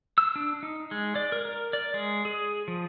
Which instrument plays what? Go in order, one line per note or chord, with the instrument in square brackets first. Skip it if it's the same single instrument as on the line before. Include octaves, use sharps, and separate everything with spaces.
[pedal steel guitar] E6
D4
D#4
G#3
D5
A#4
A#4
D5
G#3
G#4
F3